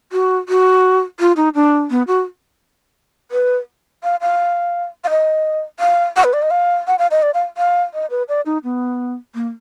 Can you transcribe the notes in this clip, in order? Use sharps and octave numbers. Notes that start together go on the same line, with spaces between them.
F#4
F#4
F4
D#4
D4
B3
F#4
B4
F5
F5
F5
D#5
F5
F#5
B4
D5
D#5
F5
F#5
F5
D#5
D5
F5
F5
D#5
B4
D5
D#4
B3
A#3